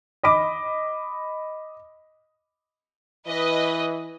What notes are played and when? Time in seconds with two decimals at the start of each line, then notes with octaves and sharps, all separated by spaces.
0.23 D#5 B5 D6
3.27 E3 B4 D#5